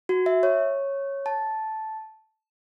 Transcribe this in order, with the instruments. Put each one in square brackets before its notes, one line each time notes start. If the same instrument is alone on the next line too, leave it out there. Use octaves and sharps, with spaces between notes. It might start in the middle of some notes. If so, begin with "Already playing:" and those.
[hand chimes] F#4
E5
C#5
A5